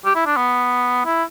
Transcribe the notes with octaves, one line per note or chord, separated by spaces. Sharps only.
G4
E4
D4
B3
E4